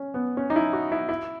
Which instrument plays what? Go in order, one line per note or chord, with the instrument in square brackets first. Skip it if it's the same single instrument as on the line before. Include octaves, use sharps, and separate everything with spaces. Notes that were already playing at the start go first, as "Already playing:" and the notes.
Already playing: [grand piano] C#4
B3
C#4
D#4
E4
F#4
E4
E4